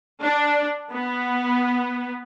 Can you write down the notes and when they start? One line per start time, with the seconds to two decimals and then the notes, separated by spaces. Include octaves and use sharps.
0.22 D4
0.92 B3